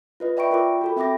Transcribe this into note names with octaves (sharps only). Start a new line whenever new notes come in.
F4 B4 D#5
D5 E5 G5 B5 C#6 D7
F4 A#4 G5 B5 D6
F#4 A4 B5
C4 E5 G5 B5 D6 A#6